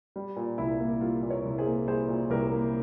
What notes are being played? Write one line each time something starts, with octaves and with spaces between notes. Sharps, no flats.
G3
A#2
C2 E4
A#3
G3 F4
A#2
A#4 C#5
C2
G#4 C5
A#3
G3 G#4 C5
A#2
C2 G4 A#4
A#3